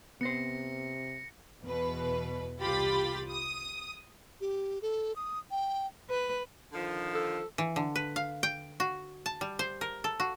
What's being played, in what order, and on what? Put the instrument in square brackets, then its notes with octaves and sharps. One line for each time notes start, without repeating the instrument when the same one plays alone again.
[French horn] C3 [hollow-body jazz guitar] B3 C5 [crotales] A#6 C#7
[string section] E2 B2 B4
C2 F4 G4 B5 A6
D#6
[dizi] G4
A4
D#6
G5
[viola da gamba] B4
[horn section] D3 D#3 F3
[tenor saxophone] A4
[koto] E3
D3
B4
F5
G5
F#4
A5
G3
C5
A#4
A4
F#4